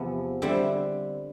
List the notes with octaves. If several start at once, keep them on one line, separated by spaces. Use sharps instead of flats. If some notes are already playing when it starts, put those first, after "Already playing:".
Already playing: E2 C3 F3 B3
D3 G3 C4 E4